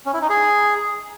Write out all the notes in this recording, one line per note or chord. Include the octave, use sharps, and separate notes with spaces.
C#4
E4
D#4
G#4